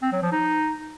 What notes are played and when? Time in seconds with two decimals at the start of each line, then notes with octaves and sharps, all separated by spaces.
0.02 C4
0.12 F#3
0.22 F3
0.32 D#4